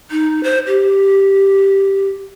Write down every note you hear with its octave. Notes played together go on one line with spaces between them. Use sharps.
D#4
C5
G4